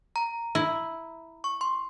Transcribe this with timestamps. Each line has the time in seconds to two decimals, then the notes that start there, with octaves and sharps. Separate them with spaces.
0.16 A#5
0.55 E4
1.44 C#6
1.61 C6